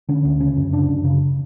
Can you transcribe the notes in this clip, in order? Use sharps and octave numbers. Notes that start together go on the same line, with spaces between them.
D3 C#4
D2
C#3 C#4
F#2
C#3 D4
F#2
C#3